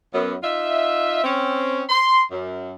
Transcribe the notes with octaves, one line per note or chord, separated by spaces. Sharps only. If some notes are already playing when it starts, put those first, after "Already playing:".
F#2 B3
D#4 F4 E5
C4 C#4
C6
F#2